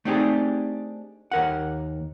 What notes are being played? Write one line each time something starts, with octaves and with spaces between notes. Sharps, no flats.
A3 C4 D4 D#4 G4 G#4
D#2 A#4 F#5